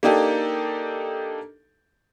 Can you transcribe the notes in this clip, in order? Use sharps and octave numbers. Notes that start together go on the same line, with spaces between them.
A#3 D4 D#4 G4 A4